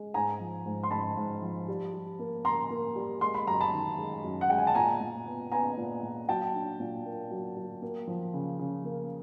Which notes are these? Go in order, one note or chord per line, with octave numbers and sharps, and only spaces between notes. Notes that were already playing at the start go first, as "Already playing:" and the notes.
Already playing: G#3
G#2 G#5 A#5
F3
G#2
C6
G#2 A5 B5
G#2
F3
G3
G3
A#3
A#3 A#5 C6
A#3
G3
G#3 C6
B5
F#2 A#5
A5 B5
D#3
G#3
F#2
F#5
G#3 G5
G#5
A5
A#2 G#5 A#5
A#2
B3
B3 G#5 A#5
A#2
A#2
F#3 G5 A5
D4
A#2
A#3
F#3
F#3
A#3
F3
C#3
C#3
A#3